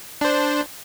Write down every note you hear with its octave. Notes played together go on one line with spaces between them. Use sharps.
D4 C5